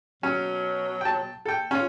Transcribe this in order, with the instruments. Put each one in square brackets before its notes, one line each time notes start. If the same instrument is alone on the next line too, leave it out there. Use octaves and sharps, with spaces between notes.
[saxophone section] B2 F#3 [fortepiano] C#4
[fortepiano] G5 A5
A4 G5
C#4 F4